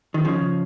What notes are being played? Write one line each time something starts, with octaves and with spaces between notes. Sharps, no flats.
D#3
C#3 F3